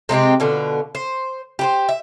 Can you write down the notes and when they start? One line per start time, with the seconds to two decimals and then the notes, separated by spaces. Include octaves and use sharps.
0.09 C3 G#3 C4 G4
0.40 B2 D3 F4
0.95 C5
1.59 G4 B4 C5
1.89 E5